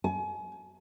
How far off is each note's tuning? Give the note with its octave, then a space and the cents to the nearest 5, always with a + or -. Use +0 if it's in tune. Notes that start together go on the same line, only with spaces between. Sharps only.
G#5 +35